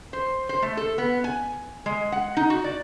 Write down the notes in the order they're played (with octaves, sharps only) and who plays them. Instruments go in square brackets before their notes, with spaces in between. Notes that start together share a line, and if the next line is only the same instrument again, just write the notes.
[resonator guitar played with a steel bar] C5
C5
A3
A4
B3
G#5
G#3
F#5
D#4
F#4
D5